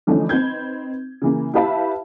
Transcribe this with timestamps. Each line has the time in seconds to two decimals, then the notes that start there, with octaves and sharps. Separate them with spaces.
0.07 D3 E3 F3 A3 C#4 D#4
0.29 C4 D#4 B4 G6 G#6
1.22 C#3 E3 A#3
1.54 E4 G4 B4 E5 F5 A5